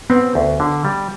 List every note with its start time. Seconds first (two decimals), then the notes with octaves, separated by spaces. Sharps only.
0.10 B3 C4
0.35 D2
0.60 D3
0.85 G3